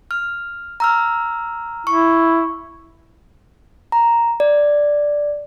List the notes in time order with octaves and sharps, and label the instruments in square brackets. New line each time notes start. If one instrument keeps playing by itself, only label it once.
[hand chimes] F6
A#5 E6 F6
[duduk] E4 [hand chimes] C#6
[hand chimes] A#5
D5